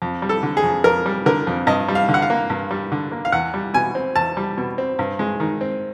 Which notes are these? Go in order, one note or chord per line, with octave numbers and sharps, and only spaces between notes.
F2
G3
A4
D3
G#4
F2
F2 A#4
G3
D3 A#4
F2
G2 D#5
G3
F5
D3
F#5
F5
A#3
G2
G3
D3
A#3
F5
E2 F#5
G3
B2 G#5
C4
E2 A5
G3
B2
C4
G2
G#3
D#3
C4